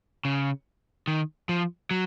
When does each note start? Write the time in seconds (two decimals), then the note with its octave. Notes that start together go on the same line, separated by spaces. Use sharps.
0.25 C#3
1.08 D#3
1.49 F3
1.91 F#3